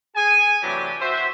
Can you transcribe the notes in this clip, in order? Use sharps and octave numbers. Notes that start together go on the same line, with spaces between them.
G#4 G#5
C3 E3 F#3 A3 D4 G4
F#4 C5 E5